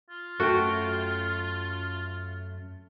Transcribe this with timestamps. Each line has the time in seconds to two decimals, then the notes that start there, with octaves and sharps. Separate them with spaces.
0.10 F4
0.40 F#2 A3 F#4 G5